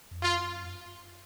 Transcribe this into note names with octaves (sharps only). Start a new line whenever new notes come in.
F2
F#2 F4